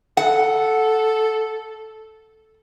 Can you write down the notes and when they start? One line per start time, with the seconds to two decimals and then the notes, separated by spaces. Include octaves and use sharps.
0.17 A4 F#5